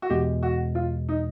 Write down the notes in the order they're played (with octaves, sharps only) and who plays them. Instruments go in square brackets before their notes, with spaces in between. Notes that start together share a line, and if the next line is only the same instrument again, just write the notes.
[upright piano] F#4
[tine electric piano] E2 B2 G#3 [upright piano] G4
[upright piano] F#4
F4
D#4